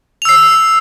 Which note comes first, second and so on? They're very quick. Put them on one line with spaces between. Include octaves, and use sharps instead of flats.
F7 E6 C7